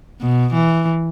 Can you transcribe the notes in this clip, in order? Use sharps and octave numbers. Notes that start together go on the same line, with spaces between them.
B2
E3